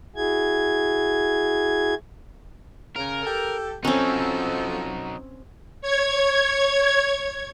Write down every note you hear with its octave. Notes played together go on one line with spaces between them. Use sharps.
E4 F#4 G#4 G#6
C#3 A#4
G4 A4
F3 F#3 C4 C#4 D#4 A4
C#5 G#6